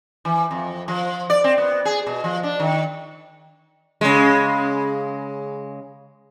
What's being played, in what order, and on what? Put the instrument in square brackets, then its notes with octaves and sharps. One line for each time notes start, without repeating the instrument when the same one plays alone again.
[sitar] E3
F2
F3
D5
C4
B3
G#4
B2
F3
D4
D#3
C#3 G#3